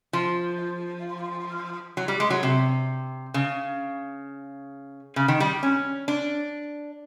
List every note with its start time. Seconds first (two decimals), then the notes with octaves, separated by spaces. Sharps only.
0.13 F3
1.97 F#3
2.08 G3
2.20 G#3
2.30 F#3
2.43 C3
3.34 C#3
5.16 C#3
5.28 D#3
5.40 G3
5.63 C#4
6.08 D4